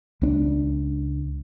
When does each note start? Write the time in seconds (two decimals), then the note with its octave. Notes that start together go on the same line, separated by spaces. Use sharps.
0.22 C#2 C4 D4